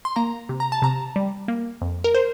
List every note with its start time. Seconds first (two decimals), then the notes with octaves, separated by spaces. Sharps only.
0.05 C6
0.16 A#3 A#5
0.49 C3
0.60 A#5
0.72 A5
0.82 C3 A#5
1.16 G3
1.48 A#3
1.82 F2
2.04 A#4
2.15 C5